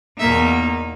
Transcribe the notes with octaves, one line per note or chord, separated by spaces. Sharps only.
E2 B2 A#3 D#4 E5